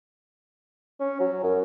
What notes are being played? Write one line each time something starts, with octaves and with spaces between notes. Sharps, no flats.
C#4
F#3
F#2